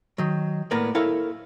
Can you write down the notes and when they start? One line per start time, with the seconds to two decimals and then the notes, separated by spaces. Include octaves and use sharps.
0.18 D#3 F#3
0.71 A2 A#3 B3 A#4 D5
0.95 E4 A4 A#4 C#5 F5